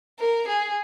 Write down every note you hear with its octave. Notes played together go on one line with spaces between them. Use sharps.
A#4
G#4